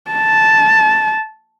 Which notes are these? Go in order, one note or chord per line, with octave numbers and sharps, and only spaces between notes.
A5